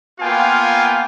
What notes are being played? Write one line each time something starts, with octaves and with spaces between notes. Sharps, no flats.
A#3 B3 F4 F5 G5 G#5